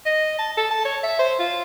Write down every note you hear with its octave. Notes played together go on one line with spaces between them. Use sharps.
D#5
A5
A4
A5
C#5
E5
C5
F4